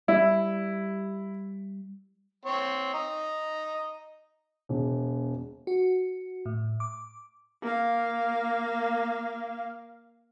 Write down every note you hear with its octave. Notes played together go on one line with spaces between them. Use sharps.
G3 E4
C4 C#5
D#5 A#5
E1
F#4
A2
D6
A#3 F5